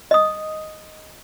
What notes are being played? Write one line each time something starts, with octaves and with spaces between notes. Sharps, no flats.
D#5 D#6